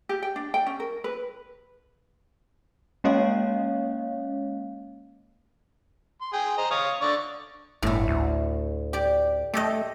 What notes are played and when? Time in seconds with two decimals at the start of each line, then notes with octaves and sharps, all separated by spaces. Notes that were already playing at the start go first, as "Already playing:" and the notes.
0.09 G4
0.22 G5
0.36 D4
0.54 G5
0.67 C#4
0.80 A#4
1.04 B4
3.04 G#3 A#3 C#4 C#5 D#5 F5
6.21 C6
6.33 G#4 G5
6.58 C5 D#5 A#5
6.71 C#5 F5 D#6
7.01 D3 D5 C#6
7.82 G1 A2 A3
8.08 D2
8.93 G4 D5
9.54 A3 G4 A4 D#5